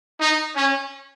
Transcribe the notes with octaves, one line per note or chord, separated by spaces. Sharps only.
D#4
C#4